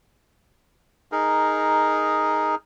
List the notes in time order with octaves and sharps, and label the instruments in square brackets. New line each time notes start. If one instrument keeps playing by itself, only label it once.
[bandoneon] D#4 G#4 A#4